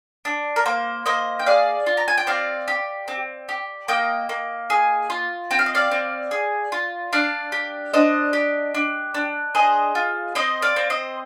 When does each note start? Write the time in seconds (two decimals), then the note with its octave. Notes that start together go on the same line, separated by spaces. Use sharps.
0.25 D4
0.56 A#4
0.66 A#3 C5
1.06 A#3 C5 D#5
1.39 G5
1.46 G#4 D5 F5
1.86 F4
1.97 A#5
2.08 G#5
2.18 G5
2.27 C4 D5 F5
2.68 G4
3.08 C4
3.49 G4
3.88 A#3 D#5 G5
4.29 A#3
4.70 G#4
5.10 F4
5.51 C4 G5
5.59 F5
5.66 D#5
5.75 D5 F5
5.91 C4
6.31 G#4
6.72 F4
7.13 D4 D5 F5
7.52 G4
7.94 D4 C5 D#5
8.33 G4
8.75 D4
9.14 D4
9.55 G#4 C5 D#5
9.95 F4
10.35 C4 C5 D#5
10.62 D5 F5
10.76 C4
10.90 C5 D#5